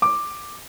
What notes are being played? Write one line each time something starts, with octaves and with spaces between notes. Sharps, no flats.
D6